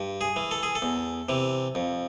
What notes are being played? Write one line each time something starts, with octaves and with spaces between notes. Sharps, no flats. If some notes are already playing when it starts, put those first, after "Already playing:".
Already playing: G2
G#4
E3
A4
G#4
A4
E2
C3 E3
F2